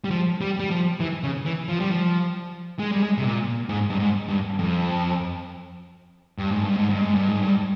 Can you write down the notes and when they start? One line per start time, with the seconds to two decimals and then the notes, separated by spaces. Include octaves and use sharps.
0.04 G3
0.11 F3
0.41 G3
0.60 G3
0.71 F3
1.00 E3
1.24 C#3
1.45 E3
1.68 F3
1.80 G3
1.91 F3
2.79 G#3
2.92 G3
3.03 G#3
3.18 C3
3.24 A#2
3.69 G#2
3.90 G2
3.99 G#2
4.28 G2
4.59 F2
6.38 G2
6.51 G#2
6.64 G2
6.77 G#2
6.89 G2
7.02 G#2
7.15 G2
7.29 G#2
7.42 G2